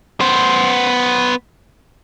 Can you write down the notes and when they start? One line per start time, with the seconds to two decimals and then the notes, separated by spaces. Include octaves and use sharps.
0.21 B3 C5